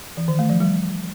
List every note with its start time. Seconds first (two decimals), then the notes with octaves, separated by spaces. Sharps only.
0.17 E3
0.28 D#3
0.39 A3
0.50 F3
0.60 G3